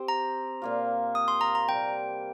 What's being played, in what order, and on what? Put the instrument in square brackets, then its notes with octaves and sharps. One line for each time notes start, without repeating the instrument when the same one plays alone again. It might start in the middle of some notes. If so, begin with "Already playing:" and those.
Already playing: [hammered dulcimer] C4 G4 C5
[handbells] A#5
[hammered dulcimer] A#2 A#3 F4
[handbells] D#6
C6
A#5
A#5
[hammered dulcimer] C3 G3 A#3 [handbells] G5